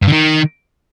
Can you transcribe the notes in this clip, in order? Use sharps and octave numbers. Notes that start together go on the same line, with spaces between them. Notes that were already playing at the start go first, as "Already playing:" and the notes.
G2
D3
D#3